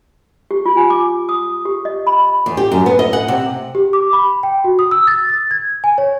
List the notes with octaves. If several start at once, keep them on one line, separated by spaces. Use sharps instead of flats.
G4
F4
G#5
D6
D#6
G4
D#5
B5
E2
G4
F#2
B3
D#5
F#5
C3
G4
D6
B5
G5
F#4
D#6
E6
A6
A6
G#6
G#5
C#5